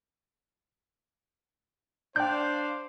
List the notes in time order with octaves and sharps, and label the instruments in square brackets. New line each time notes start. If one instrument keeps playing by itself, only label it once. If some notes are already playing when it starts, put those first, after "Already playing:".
[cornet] D4 [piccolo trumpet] C5 [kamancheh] D5 F5 [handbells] G5 G6